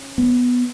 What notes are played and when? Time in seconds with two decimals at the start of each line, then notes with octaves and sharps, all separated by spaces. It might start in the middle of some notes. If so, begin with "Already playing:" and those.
Already playing: C#4
0.18 B3